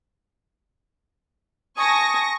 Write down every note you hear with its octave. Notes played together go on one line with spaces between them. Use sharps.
G#5 A5 C#6 D#6 A#6